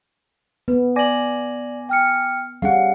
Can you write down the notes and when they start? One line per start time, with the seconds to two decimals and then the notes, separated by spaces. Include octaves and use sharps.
0.68 B3 B4
0.96 D5 G#5 D6 A#6 F#7
1.89 G5 F6 C#7
2.62 G3 C#4 G#4 F5 F#5